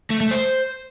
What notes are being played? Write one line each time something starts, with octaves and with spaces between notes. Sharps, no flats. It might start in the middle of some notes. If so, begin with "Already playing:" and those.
A3
A3
C5